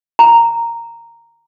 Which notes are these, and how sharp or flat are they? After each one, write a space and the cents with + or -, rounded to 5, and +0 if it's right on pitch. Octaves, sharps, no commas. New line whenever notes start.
A#5 -5